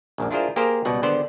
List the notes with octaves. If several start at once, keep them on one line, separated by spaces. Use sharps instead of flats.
A#1 F#2 G3
D4 E4 F4 G#4 A#4 C5
A#3 G4 G#4 A#4 C5
C#2 B2 G3 F#5
G#1 D3 B3 C5 D5 F#5